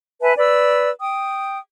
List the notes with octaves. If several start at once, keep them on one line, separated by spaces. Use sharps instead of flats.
B4 E5 G#5 A5
B4 D5 E6
G5 D#6